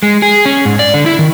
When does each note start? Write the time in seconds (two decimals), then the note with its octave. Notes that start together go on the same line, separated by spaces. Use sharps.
0.03 G#3
0.22 G#4
0.45 C#4
0.65 G#2
0.79 D5
0.94 D3
1.06 E4
1.19 D#3